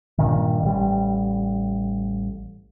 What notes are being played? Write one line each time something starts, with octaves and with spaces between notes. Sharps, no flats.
G2 A#2 D#3
A1 G3